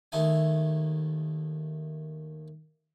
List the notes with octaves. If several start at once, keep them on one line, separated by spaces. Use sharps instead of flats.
D#2 A3 D#4 E5 G#5